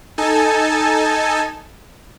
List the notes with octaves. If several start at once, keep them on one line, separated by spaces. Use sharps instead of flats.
D#4 A4 G#5 A5